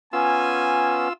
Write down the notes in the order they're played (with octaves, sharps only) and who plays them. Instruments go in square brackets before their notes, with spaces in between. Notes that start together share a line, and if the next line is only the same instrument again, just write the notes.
[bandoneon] B3 C#4 [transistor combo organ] F4 E6 [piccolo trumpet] G#5